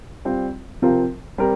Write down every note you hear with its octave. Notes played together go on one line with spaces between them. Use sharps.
G3 C4 F4
C3 F3 C4 F4 A#4
G3 C4 G4 A#4